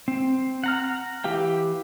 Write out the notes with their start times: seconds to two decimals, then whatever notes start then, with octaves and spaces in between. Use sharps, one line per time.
0.08 C4
0.64 F#5 A#5 F6
1.24 E3 G4 F5 G5